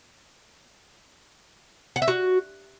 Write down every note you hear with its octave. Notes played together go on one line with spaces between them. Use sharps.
F#5
E5
F#4